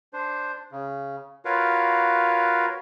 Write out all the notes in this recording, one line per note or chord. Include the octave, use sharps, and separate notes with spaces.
D4 C5
C#3
F4 F#4 A#4 B4 C#5 F5